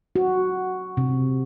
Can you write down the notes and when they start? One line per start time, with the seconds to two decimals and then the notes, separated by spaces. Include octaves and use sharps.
0.16 F#4
0.97 C3